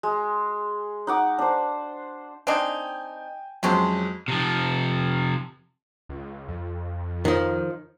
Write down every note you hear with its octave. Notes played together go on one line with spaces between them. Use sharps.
G#3
D#4 F#5 D6
D4 C5
C4 D4 D#4 G5 G#5
F2 C3 F#3 G#3 C#4 C5
C3 F3
C#2
F2
D#3 F3